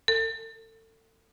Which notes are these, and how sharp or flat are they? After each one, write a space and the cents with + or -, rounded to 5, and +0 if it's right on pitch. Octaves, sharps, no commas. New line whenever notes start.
A4 +30